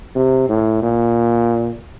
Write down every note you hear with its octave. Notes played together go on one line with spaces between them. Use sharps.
C3
A2
A#2